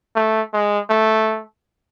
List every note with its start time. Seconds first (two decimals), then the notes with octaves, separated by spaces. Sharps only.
0.16 A3
0.53 G#3
0.89 A3